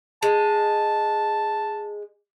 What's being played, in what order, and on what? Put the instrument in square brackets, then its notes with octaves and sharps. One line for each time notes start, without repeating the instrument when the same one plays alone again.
[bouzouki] G#3 [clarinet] A5